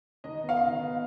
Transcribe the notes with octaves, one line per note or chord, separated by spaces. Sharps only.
D#3 D#5
B3
F5
D#3
B3